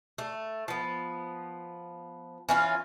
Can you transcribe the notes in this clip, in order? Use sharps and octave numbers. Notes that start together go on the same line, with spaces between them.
A3
F3 B3
E3 C#4 F4